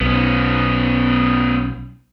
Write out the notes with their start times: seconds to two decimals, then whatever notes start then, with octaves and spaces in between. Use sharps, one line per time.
0.01 B1 B3 C#4